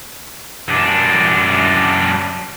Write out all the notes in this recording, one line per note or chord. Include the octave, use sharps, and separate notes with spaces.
F#2 D4